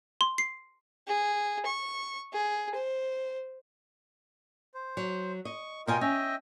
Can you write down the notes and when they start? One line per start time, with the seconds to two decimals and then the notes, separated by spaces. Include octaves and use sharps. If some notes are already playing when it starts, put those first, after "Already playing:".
0.21 C6
0.38 C7
1.07 G#4
1.66 C#6
2.33 G#4
2.75 C5
4.74 C5
4.97 F#3
5.45 D#5 C#6
5.87 B2 F4 A#4 D#5 G5 G#5
6.01 C#4 D#5 E5 G5